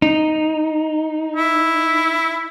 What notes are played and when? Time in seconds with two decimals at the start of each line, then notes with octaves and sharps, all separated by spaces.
0.02 D#4
1.36 E4